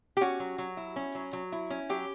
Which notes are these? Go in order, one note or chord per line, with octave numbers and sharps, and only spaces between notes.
G4
C#4 F#4
F#3
F#3
E4
C#4
F#3
F#3
E4
C#4
F#3 G4